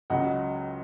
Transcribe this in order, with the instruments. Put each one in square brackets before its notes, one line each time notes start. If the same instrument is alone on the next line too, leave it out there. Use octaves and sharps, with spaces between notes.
[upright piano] C#2 C#3 F#3 D#5 F#5